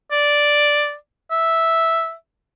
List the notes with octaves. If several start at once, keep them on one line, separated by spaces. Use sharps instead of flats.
D5
E5